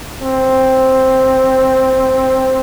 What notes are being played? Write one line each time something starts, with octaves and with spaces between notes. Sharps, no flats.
C4